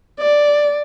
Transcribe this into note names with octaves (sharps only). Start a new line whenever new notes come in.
D5